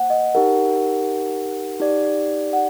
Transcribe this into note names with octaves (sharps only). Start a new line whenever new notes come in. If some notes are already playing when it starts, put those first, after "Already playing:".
Already playing: A#3 C5 F#5
D#5
D#4 G4 A#4 F#5
D#4 G4 D5
F#5